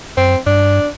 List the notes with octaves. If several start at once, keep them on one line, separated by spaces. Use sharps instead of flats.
F#2 C4
G2 D4